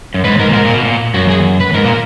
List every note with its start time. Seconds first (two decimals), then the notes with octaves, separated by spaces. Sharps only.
0.14 F#2
0.24 G#2 B4
0.40 G#2 A#4
0.50 A#2
0.54 G#2 A#4
0.65 A#2
0.75 B2
0.85 A#2
1.14 F#2 F#4
1.29 G#4
1.60 B4
1.74 G#2 A#4
1.85 A#2